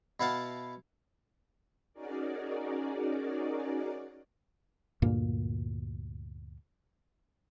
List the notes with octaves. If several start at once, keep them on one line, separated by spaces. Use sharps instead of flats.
B2 E4 F5 F#5 A5
C#4 D#4 F#4 G#4 A#4 D5
D2 G2 A#2 A#3